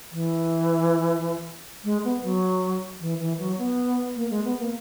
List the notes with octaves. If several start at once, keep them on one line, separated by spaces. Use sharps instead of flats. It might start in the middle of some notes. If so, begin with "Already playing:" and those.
E3
G#3
B3
F#3
E3
E3
F#3
B3
A#3
G#3
B3
A#3